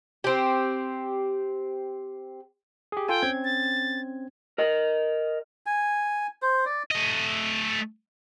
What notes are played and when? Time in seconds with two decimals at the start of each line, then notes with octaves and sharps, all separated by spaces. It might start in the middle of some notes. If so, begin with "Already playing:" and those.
0.24 C4 G4
2.92 G4 G#4
3.08 F4 A4 G5 G#5
3.23 C4 C#4 G#6
3.44 A6
4.58 A#4 D#5
5.66 G#5
6.42 C5
6.66 D5
6.91 A3 D#5